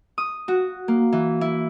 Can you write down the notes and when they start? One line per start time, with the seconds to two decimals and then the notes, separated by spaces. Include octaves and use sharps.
0.18 D#6
0.48 F#4
0.88 A#3
1.13 E3
1.41 E4